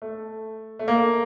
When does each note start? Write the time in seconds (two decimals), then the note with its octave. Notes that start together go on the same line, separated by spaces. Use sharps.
0.02 A3
0.79 A3
0.88 A#3